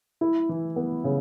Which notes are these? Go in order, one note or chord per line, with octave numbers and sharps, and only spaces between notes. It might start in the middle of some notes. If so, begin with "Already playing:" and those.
E4
E3
B3
C#3